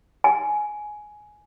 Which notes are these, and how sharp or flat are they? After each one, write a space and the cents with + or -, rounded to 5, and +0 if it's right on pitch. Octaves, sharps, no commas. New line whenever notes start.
G#5 +10